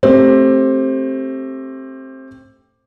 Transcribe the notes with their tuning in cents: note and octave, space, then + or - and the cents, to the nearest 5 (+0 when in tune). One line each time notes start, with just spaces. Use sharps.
A3 +0 C4 +20 G4 +0